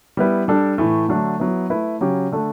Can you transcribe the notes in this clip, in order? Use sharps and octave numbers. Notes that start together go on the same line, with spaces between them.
G3 B3 E4 B4
G3 D4 A4
A2 E3 A3
D3 F#3 A3 D4 A4
F#3 B3 E4
A3 E4 B4
C#3 F#3 C#4 G4 C#5
D3 A3 D4 A4